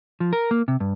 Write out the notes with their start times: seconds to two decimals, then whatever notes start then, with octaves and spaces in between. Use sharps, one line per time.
0.20 F3
0.33 A#4
0.51 A#3
0.68 C3
0.80 G2